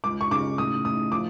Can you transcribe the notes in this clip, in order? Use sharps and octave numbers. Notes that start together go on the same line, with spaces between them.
C#2 D6
C#6
C#3 D6
A2 D#6
A2 D#6
F3 D6